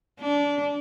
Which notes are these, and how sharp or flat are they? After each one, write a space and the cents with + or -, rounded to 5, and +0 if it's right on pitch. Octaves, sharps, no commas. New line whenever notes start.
D4 -25